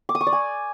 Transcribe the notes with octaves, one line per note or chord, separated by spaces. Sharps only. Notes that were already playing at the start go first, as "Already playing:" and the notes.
D6
D#6
C#6
D5
G#5